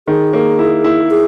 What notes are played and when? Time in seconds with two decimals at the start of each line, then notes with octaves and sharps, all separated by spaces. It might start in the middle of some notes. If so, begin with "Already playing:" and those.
0.07 D#3 G#4
0.33 A#3
0.59 E4
0.84 E4
1.10 G#4